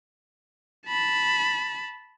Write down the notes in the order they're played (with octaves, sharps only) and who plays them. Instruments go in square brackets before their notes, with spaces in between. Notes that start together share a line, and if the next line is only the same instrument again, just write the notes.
[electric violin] A5 B5